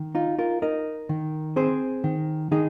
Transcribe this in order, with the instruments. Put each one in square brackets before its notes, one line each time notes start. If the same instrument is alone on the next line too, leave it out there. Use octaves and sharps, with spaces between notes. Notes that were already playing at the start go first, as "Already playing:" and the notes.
Already playing: [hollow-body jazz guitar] D#3
D#4 F4
F4 A#4
D#4 A#4 D#5
D#3
C4 G#4 C5
D#3
D#3 D#4 G#4